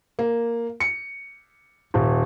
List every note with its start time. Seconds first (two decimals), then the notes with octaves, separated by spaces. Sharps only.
0.19 A#3
0.80 C#7
1.94 D#1